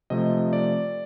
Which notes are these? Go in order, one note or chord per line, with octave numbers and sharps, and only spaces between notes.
C3 F3 A3 D#5
D5